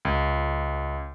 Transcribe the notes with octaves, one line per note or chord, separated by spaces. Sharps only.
C#2